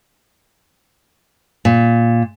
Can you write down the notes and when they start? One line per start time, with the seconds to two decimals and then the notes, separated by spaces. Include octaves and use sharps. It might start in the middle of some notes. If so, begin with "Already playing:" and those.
1.65 A#2